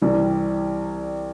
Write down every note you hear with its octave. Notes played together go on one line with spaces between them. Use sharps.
C2 C3 E3 G3